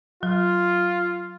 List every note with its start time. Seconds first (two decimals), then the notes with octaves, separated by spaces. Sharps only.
0.23 F#3 F4